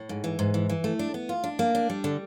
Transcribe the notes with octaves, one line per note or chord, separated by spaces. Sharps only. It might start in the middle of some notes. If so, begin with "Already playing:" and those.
Already playing: A2
G#2
E3
G#2
E3
E3
A3
D4
B3
F4
D4
A#3
D4
G3
D3